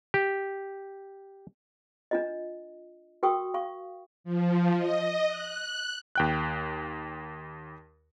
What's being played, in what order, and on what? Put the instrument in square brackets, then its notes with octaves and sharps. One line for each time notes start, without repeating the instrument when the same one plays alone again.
[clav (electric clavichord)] G4
[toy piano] D4 F4 D#5
F#4 A#4 G5 C#6 D#6
F5 C#6
[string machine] F3
D#5
F#6
[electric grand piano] D#2 G5 F#6